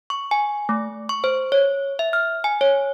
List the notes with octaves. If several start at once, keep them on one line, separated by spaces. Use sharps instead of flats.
C#6
G#5
A3
C#6
C5
C#5
E5
F6
G#5
C#5